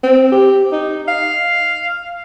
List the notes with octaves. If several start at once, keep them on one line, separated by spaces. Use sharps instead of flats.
C4
G4
D#4
F5